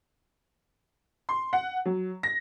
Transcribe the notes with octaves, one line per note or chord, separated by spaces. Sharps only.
C6
F#5
F#3
A#6